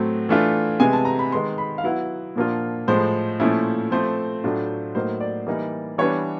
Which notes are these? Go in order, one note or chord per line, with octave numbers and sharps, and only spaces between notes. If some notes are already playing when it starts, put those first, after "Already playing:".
Already playing: A2 F#3 A3 C4
E3 A3 D4 F4
C3 E3 G#3 B3 G#5
A5
A#5
B5
D#3 G#3 B3 C6
B5
F5
F#3 B3 E4 F#5
A#2 F3 A#3 D4 F4
A2 F3 G#3 C5
A#2 F3 A3 C#4 E4
F3 A3 C4 C5
A2 F#3 A3 D4 F4
A2 F#3 A#3 D#4 C5
D5
E3 G3 A#3 D#4
E3 G3 B3 D4 C#5